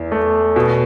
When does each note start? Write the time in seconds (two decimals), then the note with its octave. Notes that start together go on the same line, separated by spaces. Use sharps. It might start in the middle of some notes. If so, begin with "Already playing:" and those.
Already playing: E2
0.12 A3
0.56 B2